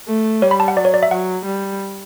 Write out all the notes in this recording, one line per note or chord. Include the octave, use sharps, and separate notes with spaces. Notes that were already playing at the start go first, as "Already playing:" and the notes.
A3
G3 C#5
B5
A5
F#5
F#3 D5
C#5
D5
E5
F#3 F#5
G3